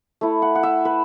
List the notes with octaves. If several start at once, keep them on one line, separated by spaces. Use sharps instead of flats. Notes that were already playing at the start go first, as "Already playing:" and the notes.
A3 E4
F#5
F#5
E5
B4